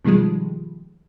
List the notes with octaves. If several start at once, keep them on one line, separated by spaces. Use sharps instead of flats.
B2 D#3 F3 G3 G#3